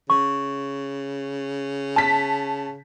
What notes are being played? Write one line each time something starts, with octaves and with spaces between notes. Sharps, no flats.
C#3 C#6
A5 B6